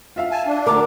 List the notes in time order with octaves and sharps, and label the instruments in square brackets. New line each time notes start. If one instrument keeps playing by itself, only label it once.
[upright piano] F4 E5 F5
[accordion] G#5 A5
D4
[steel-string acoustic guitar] D2 A#4 [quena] D6